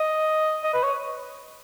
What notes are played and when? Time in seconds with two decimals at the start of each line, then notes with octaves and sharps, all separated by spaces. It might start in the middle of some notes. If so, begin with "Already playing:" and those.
Already playing: D#5
0.64 D#5
0.74 B4
0.83 C#5